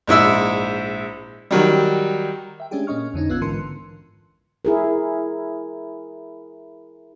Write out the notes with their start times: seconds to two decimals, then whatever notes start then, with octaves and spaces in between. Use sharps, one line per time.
0.07 A#1 G#2 E4 E6
1.51 D#3 F#3 G3
2.60 E5 G5
2.71 G#3 A3 C#4 D4 G4 G#4
2.87 A#2 A#3 C#4 D#5 C#6 F6
3.14 F2 D3 C#4 D#4
3.29 A#1 B3 F4 E6 F#6 G#6
3.41 G#2 D3 E3 A#4 C6 C#7
4.65 E4 G#4 A#4